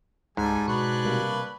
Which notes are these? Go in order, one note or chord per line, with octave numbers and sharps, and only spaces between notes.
C#2 G#2 G3 A4 G#5
B2 D4 F#4 B4 C#5
C3 G3 A#3